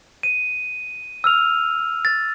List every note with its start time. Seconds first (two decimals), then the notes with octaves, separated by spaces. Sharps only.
0.23 D#7
1.24 E6 F6 F7
2.05 A6